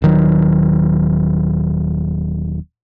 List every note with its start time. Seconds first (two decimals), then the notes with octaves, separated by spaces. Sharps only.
0.02 D#1 D#3 F#3